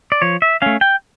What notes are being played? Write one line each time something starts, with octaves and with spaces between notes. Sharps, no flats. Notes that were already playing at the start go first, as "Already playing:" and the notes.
D5
F3 C#5
E5
A3 C#4 F5
G5